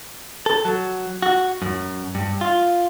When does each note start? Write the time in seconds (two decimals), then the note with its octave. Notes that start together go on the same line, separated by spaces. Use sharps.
0.46 A4
0.65 F#3
1.22 F#4
1.62 F#2
2.15 G2
2.41 F4